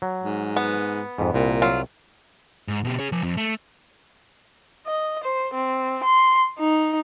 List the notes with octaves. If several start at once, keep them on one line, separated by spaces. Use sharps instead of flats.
F#3
G#2
B3
F2 G#2
C2 A#2
F#3 F4
G#2
B2 G4
G#4 C#5
F3 G#5
F2
A3
D#5
C5
C4
C6
D#4